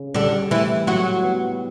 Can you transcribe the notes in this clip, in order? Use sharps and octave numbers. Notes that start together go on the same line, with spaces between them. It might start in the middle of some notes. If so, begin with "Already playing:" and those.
Already playing: C#3
D3 G3 D4
A2 E3 E4
A2 F#3 F#4
B3